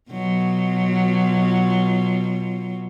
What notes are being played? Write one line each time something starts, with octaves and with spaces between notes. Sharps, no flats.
B2 F#3 F4